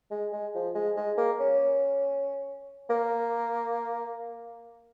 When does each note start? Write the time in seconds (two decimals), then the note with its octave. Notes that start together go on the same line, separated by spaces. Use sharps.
0.11 G#3
0.33 G#3
0.55 F3
0.75 G#3
0.96 G#3
1.18 A#3
1.40 C#4
2.90 A#3